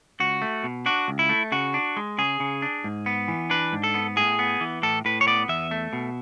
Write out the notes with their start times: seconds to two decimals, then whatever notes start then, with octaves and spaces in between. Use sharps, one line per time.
0.20 C#2 F#4
0.42 A3
0.64 B2
0.86 D4 F#4
1.08 C#2
1.19 E4
1.29 A3
1.52 C#3 F#4
1.74 D4
1.97 G#3
2.18 C#3 G#4
2.40 C#3
2.62 D4
2.84 G#2
3.06 B3
3.28 E3
3.50 D4 B4
3.73 G#2
3.84 A4
3.94 B3
4.16 A2 G#4
4.39 B3
4.61 E3
4.83 A2 A4
5.05 A2 B4
5.21 C#5
5.27 B3 D5
5.49 E2 E5
5.71 A3
5.93 B2